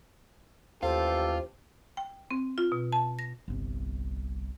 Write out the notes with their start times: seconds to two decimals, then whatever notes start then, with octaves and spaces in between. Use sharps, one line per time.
0.83 A1 D#2 F4 G4 A4 C5
1.97 G5
2.31 C4
2.58 F4
2.72 B2
2.92 A5
3.19 A#6
3.48 G1 C2